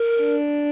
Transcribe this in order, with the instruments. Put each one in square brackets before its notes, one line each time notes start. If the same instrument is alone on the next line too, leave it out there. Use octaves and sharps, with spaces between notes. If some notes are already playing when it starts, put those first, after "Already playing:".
Already playing: [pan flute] A#4
[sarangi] D4